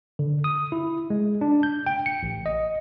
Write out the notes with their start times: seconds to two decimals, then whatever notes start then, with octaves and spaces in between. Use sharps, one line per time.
0.19 D3
0.44 D#6
0.72 E4
1.10 G#3
1.41 D4
1.63 G6
1.86 G5
2.06 C#7
2.23 A1
2.46 D#5